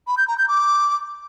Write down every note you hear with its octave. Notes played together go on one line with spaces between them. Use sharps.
B5
G6
A#5
G6
D6